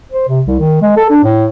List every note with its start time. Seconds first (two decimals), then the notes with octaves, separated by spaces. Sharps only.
0.12 C5
0.28 C3
0.47 C2
0.60 D#3
0.82 G#3
0.97 A4
1.10 D4
1.24 A2